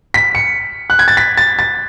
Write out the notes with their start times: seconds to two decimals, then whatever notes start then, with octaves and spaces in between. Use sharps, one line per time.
0.14 B6
0.35 C#7
0.90 F#6
0.99 G#6
1.08 A6
1.17 B6
1.37 A6
1.59 A6